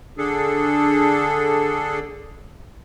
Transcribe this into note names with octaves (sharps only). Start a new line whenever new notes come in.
D3 D4 G#4 A4